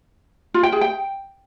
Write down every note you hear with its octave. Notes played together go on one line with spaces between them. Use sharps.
F4
G5
G#4
G5